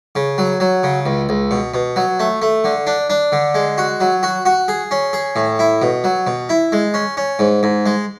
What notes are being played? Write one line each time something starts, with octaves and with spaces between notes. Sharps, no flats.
C#3
F#3
F#3
C#3
C#2
C#2
B2
B2
F#3
A3
A3
D3
D4
D4
D3
G#3
F#4
F#3
F#4
F#4
G#4
C#4
G#4
A2
E4
B2
F#3
B2
E4
G#3
C#4
C#4
G#2
G#2
G#3